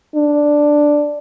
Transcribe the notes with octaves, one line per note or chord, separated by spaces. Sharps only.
D4